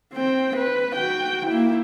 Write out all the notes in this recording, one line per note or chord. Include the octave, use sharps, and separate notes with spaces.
C4 G5
B4
F#4 G5
A#3 E4